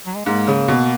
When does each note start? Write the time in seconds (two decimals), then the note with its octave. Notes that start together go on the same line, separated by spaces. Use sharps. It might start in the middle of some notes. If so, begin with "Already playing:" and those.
0.06 F#3
0.16 G#3
0.25 G#2 A#3
0.47 C#3
0.68 B2